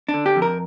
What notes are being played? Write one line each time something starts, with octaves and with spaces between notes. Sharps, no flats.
D4
D3
G4
F2
A#4